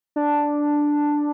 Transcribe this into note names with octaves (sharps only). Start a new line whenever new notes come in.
D4